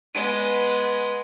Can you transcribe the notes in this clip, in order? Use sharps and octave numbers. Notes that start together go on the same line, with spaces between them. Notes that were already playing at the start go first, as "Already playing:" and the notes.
G#3 B3